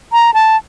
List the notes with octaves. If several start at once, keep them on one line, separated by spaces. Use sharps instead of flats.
A#5
A5